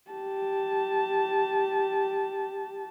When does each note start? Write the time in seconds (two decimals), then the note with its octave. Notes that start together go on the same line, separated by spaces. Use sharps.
0.11 G4 A5